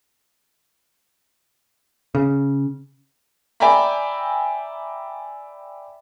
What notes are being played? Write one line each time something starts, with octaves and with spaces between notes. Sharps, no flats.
C#3
D5 E5 G5 G#5 A#5 B5